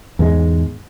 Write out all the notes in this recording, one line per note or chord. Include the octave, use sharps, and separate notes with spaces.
E2 G#2 G#3